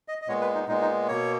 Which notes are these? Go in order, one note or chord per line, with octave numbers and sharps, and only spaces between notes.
D#5
D#5
A#2 G#3 B3 C#5
B4
D#4
A#2 G#3 B3 D#4
D#4
B2 A#3 C#5